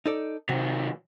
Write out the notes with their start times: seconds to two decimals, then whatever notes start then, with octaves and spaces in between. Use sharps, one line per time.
0.06 D#4 A4 D5
0.49 C3 D#3 F#3